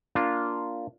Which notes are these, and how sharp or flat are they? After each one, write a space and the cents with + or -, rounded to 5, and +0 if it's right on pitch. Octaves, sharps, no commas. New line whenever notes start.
A#3 +0 D4 -10 F4 +0